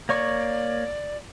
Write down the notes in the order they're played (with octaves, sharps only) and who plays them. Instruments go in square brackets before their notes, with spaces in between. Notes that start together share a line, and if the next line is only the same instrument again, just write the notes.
[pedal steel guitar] A#3 C#5 C#6 [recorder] D5